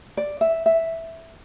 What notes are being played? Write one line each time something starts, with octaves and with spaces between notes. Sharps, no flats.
D5
E5
E5